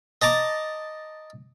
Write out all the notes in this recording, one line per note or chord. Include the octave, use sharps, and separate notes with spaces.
D#5 A5 A#5 D6